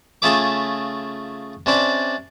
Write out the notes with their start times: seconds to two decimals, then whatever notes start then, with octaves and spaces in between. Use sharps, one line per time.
0.22 C#3 A3 F4 G#4 E5 D6
1.66 C3 C#4 D4 C5 D5 B5